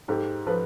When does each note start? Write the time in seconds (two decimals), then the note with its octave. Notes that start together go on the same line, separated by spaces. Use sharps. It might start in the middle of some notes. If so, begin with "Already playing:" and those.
0.08 G#2 G4 A4
0.46 F3 A4 B4